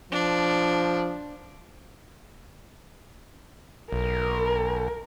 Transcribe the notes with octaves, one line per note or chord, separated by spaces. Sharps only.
F3 D4
B1 A#4